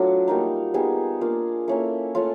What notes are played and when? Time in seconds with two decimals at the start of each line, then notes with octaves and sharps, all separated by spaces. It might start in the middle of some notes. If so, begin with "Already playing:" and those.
Already playing: F#3 A3 D4 F4 F#4
0.28 G3 A#3 D#4
0.74 G3 B3 D#4 G#4
1.21 A#3 D4 F4
1.68 A#3 C#4 E4 A4
2.15 A3 C#4 F4